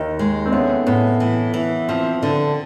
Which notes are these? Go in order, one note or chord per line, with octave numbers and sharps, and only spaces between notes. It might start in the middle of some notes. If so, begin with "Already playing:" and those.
Already playing: D#2
G#3
C4
A3 B3 C#4
A2 B3 C#4
E3
E3
F3 C4
D3